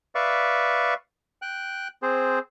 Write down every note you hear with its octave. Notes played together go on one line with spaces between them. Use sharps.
B4 D5 E5 F5 C#6
G5 F#6
C4 G#4 C5